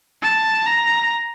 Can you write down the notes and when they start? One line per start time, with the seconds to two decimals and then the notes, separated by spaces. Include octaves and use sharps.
0.23 A5
0.67 A#5